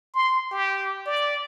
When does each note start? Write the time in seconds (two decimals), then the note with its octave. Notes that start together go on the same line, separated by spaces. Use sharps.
0.14 C6
0.51 G4
1.06 D5